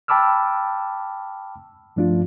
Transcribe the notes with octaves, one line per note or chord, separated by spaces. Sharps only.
G5 A5 B5 D6 E6 F6
G2 F3 A3 D4 E4 F4